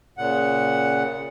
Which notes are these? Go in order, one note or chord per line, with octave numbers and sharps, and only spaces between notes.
A#2 C#3 F#5